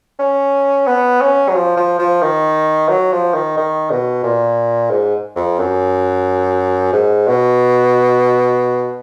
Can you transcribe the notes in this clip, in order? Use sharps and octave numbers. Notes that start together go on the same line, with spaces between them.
C#4
B3
C#4
F#3
F3
F3
F3
D#3
F#3
F3
D#3
D#3
B2
A#2
G#2
F2
F#2
G#2
B2